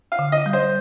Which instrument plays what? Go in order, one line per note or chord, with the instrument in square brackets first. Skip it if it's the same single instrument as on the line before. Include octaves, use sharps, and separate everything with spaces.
[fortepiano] F5
[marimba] D3
[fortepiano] D#5
[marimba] G3
[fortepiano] C5